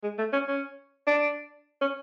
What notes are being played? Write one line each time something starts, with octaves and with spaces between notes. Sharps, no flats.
G#3
A3
C#4
C#4
D4
C#4